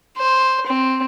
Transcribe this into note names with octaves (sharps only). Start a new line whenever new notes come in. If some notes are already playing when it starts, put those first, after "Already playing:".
C5
C4